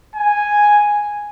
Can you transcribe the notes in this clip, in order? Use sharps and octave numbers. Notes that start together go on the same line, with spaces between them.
G#5